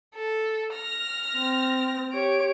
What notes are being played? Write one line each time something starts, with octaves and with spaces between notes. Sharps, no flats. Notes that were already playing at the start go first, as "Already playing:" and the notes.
A4
F6 A#6
C4
G4 C#5 D7